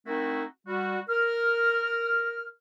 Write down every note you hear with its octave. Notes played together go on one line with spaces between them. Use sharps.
A3 C4 D#4 E4 F#4 A#4
G3 F#4
A#4 F6